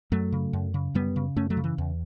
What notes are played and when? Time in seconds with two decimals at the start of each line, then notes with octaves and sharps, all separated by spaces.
0.12 F#2 F#3 A3
0.32 C#3
0.53 F#2
0.74 C#3
0.94 F#2 G3 B3
1.16 C#3
1.36 F#2 A3 C#4
1.50 F#3 A3
1.57 C#3
1.64 E3
1.78 E2